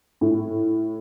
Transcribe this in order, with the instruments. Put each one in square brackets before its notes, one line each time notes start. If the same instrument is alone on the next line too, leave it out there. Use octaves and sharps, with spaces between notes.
[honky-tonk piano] A2